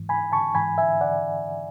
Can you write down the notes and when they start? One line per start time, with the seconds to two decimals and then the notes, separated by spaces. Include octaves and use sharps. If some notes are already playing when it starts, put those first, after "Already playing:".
Already playing: G#2 E3
0.09 G#5 B5
0.32 A5 C#6
0.55 G#2 E3 G#5 B5
0.78 E5 G#5
1.01 D5 F#5